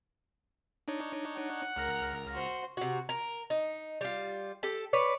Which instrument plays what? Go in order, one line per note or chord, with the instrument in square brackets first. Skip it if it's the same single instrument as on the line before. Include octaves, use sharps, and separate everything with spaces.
[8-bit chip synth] D4 D#4 C#5
[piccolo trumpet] F#5
[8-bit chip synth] C#2 F6 A#6 [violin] A#4
[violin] F#4 C5
[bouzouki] C3 F#4
A#4
D#4
G3 F4
G4 A4
B4 C#5 D5